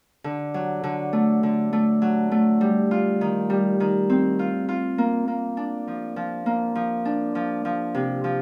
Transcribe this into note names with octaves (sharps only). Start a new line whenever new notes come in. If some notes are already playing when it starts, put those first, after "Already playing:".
D3
F#3
D3
A3
D3
A3
F#3
A3
G3
F4
D#3
G3
D#3
C4
F4
F4
A#3
A#3
D4
F3
F3
A#3
F3
D4
F3
F3
C3
F3